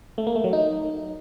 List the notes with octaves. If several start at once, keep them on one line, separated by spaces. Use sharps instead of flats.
A3
A#3
A3
F#3
D#4